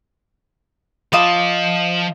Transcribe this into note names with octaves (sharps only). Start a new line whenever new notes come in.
F3 F4 D#5 A5 D6